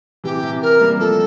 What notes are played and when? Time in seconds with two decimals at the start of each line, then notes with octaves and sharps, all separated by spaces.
0.24 C3 E3 G4
0.43 C3 E3
0.63 A#4
0.81 G3 A#3
0.99 F3 A3 A4